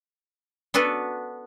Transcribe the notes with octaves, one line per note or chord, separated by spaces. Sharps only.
B3 D4 F#4 A4 B4